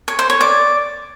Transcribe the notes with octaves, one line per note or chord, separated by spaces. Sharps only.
C#5
C5
C#5
D5